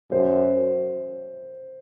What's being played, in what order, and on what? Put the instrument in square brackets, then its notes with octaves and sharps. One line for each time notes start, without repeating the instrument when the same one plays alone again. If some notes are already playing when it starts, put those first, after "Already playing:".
[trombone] F#2 [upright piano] C5